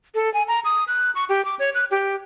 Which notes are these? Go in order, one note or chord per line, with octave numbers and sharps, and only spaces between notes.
A4
G#5
A#5
D#6
F#6
C#6
G4
D6
C#5
F#6
G4